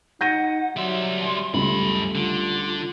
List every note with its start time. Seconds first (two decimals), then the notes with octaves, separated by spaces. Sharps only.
0.21 D#4 F#5 G6 A#6 D#7
0.76 F#3 G3 E5 C6
1.54 C#2 F#2 G3 A3 B5
2.15 D3 F4